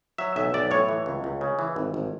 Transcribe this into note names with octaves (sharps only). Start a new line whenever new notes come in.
F#3 E5
B1 E5
B1 D5
A2 C#5
E3
C#2
C#2
C#3
E3
G#1
G#1